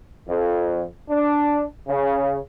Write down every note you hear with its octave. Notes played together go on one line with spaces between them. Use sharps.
F2
D4
C#3